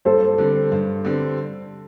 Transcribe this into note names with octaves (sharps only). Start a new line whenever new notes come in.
G2 A4 C5
D3 G3 C4
G2
D3 G3 C4